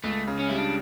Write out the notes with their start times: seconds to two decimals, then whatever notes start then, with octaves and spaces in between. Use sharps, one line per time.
0.04 C#2 A3
0.27 C#3
0.39 C#4
0.49 G3 E4
0.56 D4